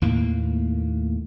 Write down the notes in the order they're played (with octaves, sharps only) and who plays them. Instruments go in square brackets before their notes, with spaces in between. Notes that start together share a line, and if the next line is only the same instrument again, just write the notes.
[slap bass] D#2 A2 A#3